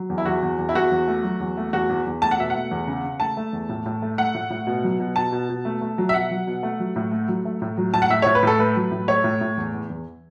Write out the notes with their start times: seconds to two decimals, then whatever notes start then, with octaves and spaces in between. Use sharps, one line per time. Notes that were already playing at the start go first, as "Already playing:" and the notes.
Already playing: F#3
0.10 E2
0.18 E4
0.26 E2 F#4
0.43 E2
0.58 E2
0.69 E4
0.75 E2 F#4
0.91 E2
1.08 A3
1.24 F#3
1.40 E2
1.57 A3
1.73 E2 F#4
1.89 E2
2.06 E2
2.22 A3 A5
2.31 F#5
2.38 B2 E5
2.50 A3 F#5
2.71 E2
2.87 C#3
3.04 C#3
3.20 A3 A5
3.37 A3
3.53 E2
3.69 A2
3.86 A2
4.02 A3
4.18 A3 F#5
4.34 A2
4.50 A2
4.67 B2
4.84 F#3
5.00 B2
5.16 B2 A5
5.32 B2
5.49 B2
5.65 A3
5.81 A3
5.98 F#3
6.09 E5
6.14 B2 F#5
6.31 F#3
6.47 B2
6.63 A3
6.80 F#3
6.96 A2
7.12 A3
7.28 F#3
7.45 A3
7.62 A2
7.77 F#3
7.94 A2 A5
8.02 F#5
8.10 A2 E5
8.22 A2 C#5
8.35 B4
8.43 A2 A4
8.59 A3 B4
8.76 F#3
8.91 A2
9.08 A3 C#5
9.24 A2
9.41 A2
9.57 E2
9.74 E2
9.90 E2